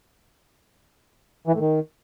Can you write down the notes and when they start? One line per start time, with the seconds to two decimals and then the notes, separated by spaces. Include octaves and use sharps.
1.48 E3
1.54 A2
1.60 D#3